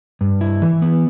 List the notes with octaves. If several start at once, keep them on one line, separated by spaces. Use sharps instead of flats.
G2
E4
E3
B3